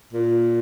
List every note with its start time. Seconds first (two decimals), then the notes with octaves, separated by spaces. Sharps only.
0.13 A#2